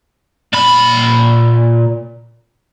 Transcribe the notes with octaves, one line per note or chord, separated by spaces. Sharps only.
A#2 B5